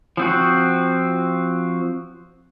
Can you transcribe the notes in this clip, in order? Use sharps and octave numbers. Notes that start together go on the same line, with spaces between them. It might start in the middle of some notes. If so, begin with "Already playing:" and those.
F3 C4 F#4